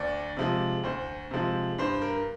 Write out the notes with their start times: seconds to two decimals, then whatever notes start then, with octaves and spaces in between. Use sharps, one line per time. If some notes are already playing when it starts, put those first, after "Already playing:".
Already playing: D2 D5
0.37 C3 F3 G#3
0.84 D2 C5
1.31 C3 F3 G#3
1.78 G2 C5
2.02 A#4